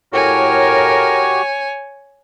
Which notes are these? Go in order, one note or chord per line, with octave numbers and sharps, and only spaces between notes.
A2 F#4 G4 A#4 C#5 G#5